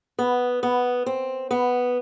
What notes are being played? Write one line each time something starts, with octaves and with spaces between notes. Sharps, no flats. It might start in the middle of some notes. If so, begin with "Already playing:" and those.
B3
B3
C4
B3